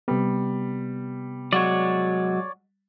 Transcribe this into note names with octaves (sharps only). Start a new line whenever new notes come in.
C3 G3 B3
F#3 G#3 F#4 C#5 D5